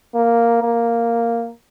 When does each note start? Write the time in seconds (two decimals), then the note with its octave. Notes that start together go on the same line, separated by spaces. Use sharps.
0.15 A#3
0.63 A#3